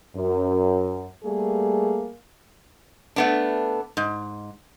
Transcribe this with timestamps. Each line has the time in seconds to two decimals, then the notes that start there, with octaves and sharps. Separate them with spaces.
0.16 F#2
1.24 G3 A3 A#3 G#4
3.16 A3 B3 D4
3.97 G#2